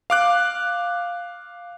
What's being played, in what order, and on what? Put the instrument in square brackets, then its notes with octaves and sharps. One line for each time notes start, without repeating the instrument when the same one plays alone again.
[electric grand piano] F5 D6 F#6